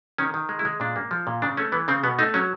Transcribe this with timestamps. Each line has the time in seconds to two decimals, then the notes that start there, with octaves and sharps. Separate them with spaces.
0.18 D#3 C#4
0.34 D#3
0.49 G#3
0.59 E4
0.65 G#3
0.80 A#2 D4
0.96 A#3
1.11 F3
1.27 A#2
1.42 C#3 D4
1.57 A3 C#4
1.72 E3 B3
1.88 C#3 C4
2.04 B2 B3
2.19 A3 D#4
2.34 F#3 C#4